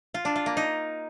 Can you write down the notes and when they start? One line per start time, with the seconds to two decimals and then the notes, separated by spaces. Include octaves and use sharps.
0.14 F4
0.25 D4
0.36 F4
0.46 A#3
0.57 D#4